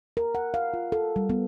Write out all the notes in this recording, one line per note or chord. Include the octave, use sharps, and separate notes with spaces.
A#4
F#5
F5
F4
A4
G3
B3